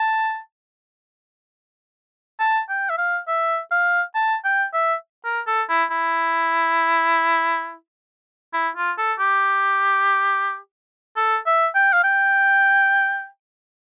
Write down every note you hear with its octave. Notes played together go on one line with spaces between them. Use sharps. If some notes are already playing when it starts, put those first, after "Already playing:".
Already playing: A5
A5
G5
E5
F5
E5
F5
A5
G5
E5
A#4
A4
E4
E4
E4
F4
A4
G4
A4
E5
G5
F5
G5